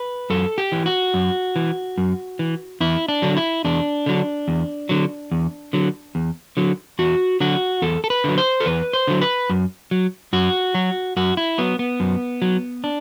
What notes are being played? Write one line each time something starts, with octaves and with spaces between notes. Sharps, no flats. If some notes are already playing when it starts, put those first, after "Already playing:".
Already playing: B4
F#2 A4
G4
E3
F#4
F#2
E3
F#2
E3
E2 E4
D4
D3 F#3
E4
E2 D4
D3 F#3
E2
D3 F#3
E2
D3 F#3
E2
D3 F#3
E2 F#4
D3 F#3 F#4
E2 A4
A4
B4
D3 F#3
C5
A4
E2 B4
C5
D3 F#3
B4
F#2
F#3
F#2 F#4
F#3
F#2 F#4
E4
F#3 B3
B3
F#2
F#3
D4